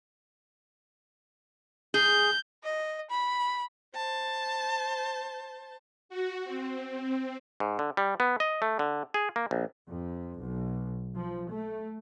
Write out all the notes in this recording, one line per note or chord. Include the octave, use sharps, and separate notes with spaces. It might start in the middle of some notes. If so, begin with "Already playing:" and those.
G#4 G6
D#5
B5
C5 A5
F#4
C4
G#2
D3
G3
B3
D#5
A3
D3
G#4
A#3
A#1
F2
B1
F3
A3